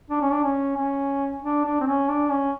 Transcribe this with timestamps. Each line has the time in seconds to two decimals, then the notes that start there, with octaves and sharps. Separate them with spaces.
0.10 D4
0.21 C#4
0.32 D4
0.44 C#4
0.76 C#4
1.42 D4
1.65 D4
1.81 C4
1.86 C#4
2.09 D4
2.31 C#4